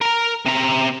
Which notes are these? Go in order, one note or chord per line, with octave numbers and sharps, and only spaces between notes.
A#4 A#5
C3 A#5